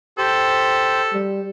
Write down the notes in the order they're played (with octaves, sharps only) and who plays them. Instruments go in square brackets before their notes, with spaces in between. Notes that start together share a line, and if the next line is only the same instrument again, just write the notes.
[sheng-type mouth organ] G4 C5 [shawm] A4
[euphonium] G3